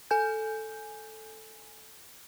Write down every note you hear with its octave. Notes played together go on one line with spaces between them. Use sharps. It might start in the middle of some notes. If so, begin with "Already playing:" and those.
A4 G#5 G6